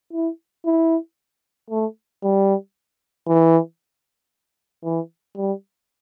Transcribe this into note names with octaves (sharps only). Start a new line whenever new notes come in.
E4
E4
A3
G3
E3
E3
G3